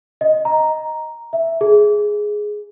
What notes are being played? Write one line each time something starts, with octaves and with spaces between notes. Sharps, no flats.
D#5
A#5
E5
G#4